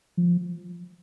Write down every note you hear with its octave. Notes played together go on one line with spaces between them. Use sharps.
F3